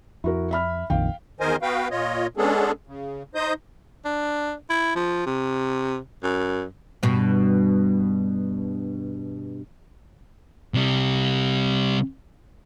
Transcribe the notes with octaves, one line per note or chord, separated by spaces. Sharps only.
F2 E4 F#4 A#4
E5 B5 F6
A#1 F2 D#3 F5 G5
E2 D#3 A#4 C5 D#5 G#5
B3 F#4 B4 F5 G5
A#2 F4 C#5 D#5
G#3 B3 C#4 D4 G#4 A4
C#3
D#4 C5 D#5 D#6 G6
D4
E4
F3
C3
F#2
G2 B2
C3 G3